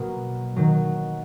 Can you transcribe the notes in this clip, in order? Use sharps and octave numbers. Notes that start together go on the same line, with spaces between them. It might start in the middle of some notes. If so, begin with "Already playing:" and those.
Already playing: B2 F#3 A#3
D#3 F#3